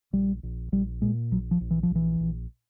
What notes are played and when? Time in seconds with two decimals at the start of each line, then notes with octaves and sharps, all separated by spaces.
0.13 A#1 G3
0.43 A#1
0.72 A#1 G3
1.02 A#2 G#3
1.31 A#1 F#3
1.51 F3
1.61 A#1
1.71 E3
1.83 F3
1.90 A#1
1.95 E3
2.20 A#1